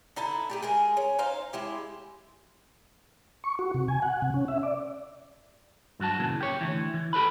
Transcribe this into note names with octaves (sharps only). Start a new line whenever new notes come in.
D3 D#4 E4 A5
A3 G4 G#4
G#3 G#4 A#4
C#4
D#4 C5 F5
G#3 E4 G4
C#6
F#4
C3
G#5
F#5
C3
C#4
E5
D5
G2 F#3 F#4 A5
A#2 C#3 E3
G4 C#5
D2 G#2 E3
E3
G4 A4 B4 B5